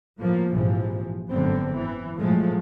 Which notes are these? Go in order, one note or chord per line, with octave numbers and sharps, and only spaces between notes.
A2 F3 A#3
A#1 G#2 C3 E3 F3
F#1 G#2 D3 B3 C4
E3
A2 F3 F#3 G#3 A3